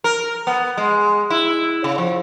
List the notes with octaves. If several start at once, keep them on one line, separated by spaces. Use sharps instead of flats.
A#4
B3
G#3
E4
C#3
F3